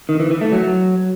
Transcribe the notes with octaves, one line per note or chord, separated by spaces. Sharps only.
D#3
E3
E3
A3
F#3